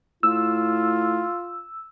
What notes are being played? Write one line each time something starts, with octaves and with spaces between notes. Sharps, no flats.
A2 F4 E6